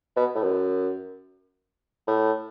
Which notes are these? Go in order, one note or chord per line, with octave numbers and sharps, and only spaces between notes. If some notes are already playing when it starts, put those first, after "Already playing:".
B2
A2
F#2
A2